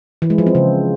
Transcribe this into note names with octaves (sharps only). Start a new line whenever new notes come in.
E3
G#3
F3
C4
C#3